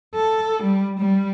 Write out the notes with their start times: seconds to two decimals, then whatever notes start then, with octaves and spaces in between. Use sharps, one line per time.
0.15 A4
0.63 G3
1.00 G3